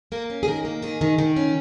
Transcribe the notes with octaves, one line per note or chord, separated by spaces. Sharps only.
A#3 A#4
C#4
G#4
D#3 A#4
A#3
D#3 G#4
D#3
D#3
C#4